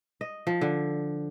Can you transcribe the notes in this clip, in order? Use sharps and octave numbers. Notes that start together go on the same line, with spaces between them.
D#5
F3
D3